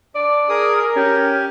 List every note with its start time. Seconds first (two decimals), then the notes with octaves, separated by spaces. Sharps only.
0.15 D4 D5
0.49 G#4 A#4 D#6
0.96 C#4 G4